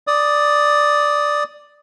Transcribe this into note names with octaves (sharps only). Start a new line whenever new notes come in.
D5 D#6